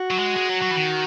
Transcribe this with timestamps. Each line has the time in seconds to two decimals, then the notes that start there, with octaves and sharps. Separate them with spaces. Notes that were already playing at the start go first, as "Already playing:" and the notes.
Already playing: F#4
0.11 F#3
0.19 G#3
0.36 G#3
0.49 F#3
0.62 F#3
0.71 E3
0.76 D#3